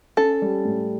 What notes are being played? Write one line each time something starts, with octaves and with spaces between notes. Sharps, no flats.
C#4 A4
G3
A2